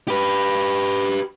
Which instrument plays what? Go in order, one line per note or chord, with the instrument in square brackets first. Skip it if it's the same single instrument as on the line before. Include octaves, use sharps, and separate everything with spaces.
[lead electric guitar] G4 B4